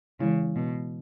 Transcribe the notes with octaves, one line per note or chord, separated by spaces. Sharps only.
C#3 E3 G#3 E4
B2